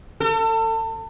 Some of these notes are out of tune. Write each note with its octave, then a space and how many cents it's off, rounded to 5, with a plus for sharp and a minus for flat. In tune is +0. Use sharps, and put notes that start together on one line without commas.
A4 +35